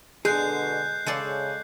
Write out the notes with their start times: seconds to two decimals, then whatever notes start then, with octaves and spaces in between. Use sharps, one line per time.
0.25 B2 D3 G#3 G#4 F#6 G6 C7
1.06 C#3 G#3 A4 D5